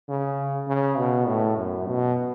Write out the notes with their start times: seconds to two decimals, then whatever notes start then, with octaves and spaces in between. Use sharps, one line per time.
0.09 C#3
0.68 C#3
0.98 B2
1.27 A2
1.57 F#2
1.87 B2